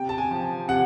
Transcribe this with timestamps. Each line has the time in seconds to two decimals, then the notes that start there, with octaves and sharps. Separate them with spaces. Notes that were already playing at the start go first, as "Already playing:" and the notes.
Already playing: C3 G5
0.09 A5
0.18 G#5
0.31 F3
0.68 C3 F#5